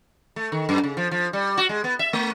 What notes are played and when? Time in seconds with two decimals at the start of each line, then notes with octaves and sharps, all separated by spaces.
0.36 A3
0.52 D#3
0.69 F#2
0.84 C#3
0.97 F3
1.11 F3
1.33 G3
1.57 F#4
1.69 G#3
1.84 B3
1.99 E5
2.13 A3